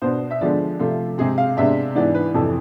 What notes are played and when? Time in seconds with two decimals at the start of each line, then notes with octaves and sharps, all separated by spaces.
0.02 B2 B3 D4 C5
0.31 E5
0.41 D3 F3 G#3 B3 D4 D5
0.79 C3 F3 A3 F4
1.18 C3 G#3 C4 G#4
1.38 F5
1.57 C3 G#3 B3 D4 E5
1.95 G#2 E3 B3 D4 D5
2.15 B4
2.34 F2 C3 E3 A4